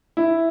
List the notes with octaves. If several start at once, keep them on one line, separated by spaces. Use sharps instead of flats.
E4